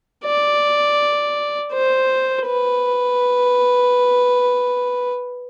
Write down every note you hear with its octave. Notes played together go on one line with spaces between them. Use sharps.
D5
C5
B4